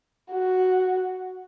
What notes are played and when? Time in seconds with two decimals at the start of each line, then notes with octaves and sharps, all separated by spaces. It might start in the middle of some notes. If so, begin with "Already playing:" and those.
0.31 F#4